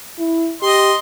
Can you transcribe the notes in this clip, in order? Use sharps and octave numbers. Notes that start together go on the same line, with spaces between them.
E4
G4 D#5 C6